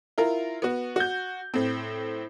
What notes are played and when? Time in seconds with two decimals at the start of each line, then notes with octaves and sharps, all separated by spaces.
0.18 E4 F4 A#4
0.62 B3 F#4
0.96 F#4 G6
1.54 A2 C4